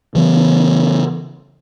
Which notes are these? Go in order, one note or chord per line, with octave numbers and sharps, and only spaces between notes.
C#3 E3 B3